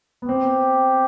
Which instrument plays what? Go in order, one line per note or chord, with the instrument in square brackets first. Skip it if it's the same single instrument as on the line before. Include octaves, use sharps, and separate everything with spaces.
[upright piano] B3
[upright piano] C4 [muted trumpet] G4